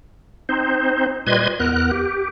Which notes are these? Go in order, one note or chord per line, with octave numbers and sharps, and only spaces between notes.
C4 D#4 C5
A#2 G3 B4 D#5 C6 G#6
E2 B3 A#4 F#6
G4